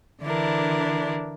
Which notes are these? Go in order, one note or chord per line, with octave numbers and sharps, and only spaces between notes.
D3 E3 D4 E4 A#4